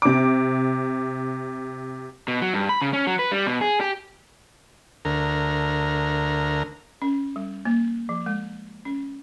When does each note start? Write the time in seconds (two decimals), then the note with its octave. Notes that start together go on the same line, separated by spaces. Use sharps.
0.02 C3 D6
2.28 B2
2.42 F#3
2.54 G2
2.69 B5
2.82 C#3
2.93 C#4
3.07 F#3
3.19 B4
3.32 G3
3.47 B2
3.61 G#4
3.81 G4
5.05 D2 A#4
7.02 C#4
7.36 G3
7.65 A#3
8.09 F3
8.26 G#3
8.85 C#4